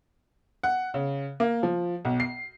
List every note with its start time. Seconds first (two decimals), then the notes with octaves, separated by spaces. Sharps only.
0.63 F#5
0.94 C#3
1.40 A#3
1.63 F3
2.05 B1
2.20 C7